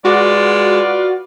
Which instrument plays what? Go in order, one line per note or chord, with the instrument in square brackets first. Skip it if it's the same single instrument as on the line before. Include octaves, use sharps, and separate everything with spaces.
[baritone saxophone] G#3 [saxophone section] F4 B4 D5 [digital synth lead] F#4